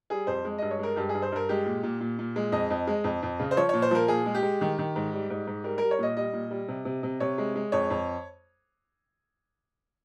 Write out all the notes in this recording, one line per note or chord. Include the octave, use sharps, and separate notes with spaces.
G3 G#4
F2 C5
G#3
G2 D#5
C#5
G#3 A#4
G2 G4
G#4
G2
C5
G2 A#4
G#3 G4
A#2
A#2
A#2
A#2
G#3
F2 D#5
F2
G#3
F2
F2
C#3
C5
F3 C#5
A#2 C#5
C5
F3 A#4
A#2 G#4
G#3
G4
G#3
D#3
D#3
G#2
G3
G#2
G#2
G3 A#4
G3 A#4
C#5
A#2 D#5
G3 D#5
A#2
G3
C3
C3
C3
C3 C#5
G#3
G#3
F2 C#5
F2